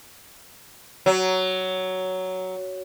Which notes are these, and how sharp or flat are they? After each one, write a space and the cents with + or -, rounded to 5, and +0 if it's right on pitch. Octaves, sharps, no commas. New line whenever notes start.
F#3 +10